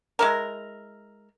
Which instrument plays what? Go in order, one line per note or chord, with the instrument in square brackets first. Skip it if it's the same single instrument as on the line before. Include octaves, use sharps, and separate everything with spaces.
[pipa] G#3 E4 A#4